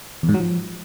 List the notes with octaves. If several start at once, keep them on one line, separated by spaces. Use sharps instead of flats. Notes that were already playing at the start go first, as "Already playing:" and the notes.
E2
G#2
F#3
F3